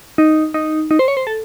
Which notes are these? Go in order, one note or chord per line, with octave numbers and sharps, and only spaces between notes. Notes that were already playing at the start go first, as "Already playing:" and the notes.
D#4
D#4
D#4
C5
C#5
C5
A4